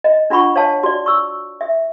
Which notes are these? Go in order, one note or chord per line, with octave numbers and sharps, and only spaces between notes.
D#5
D4 F4 F#5 B5 C#6
C#5 F5 A5
F#4 D5
C#6 E6
E5